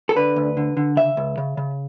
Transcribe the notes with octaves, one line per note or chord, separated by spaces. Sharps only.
A4
D3 B4
D2
D3
D3
C#3 E5
C#2
C#3
C#3